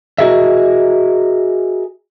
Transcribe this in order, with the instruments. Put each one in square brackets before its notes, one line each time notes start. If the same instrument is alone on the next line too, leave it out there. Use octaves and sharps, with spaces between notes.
[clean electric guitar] F#4 G#4 A#4 D#5 E5